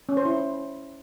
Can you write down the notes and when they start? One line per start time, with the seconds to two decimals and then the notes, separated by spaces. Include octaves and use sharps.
0.09 C#4
0.17 C5
0.25 E4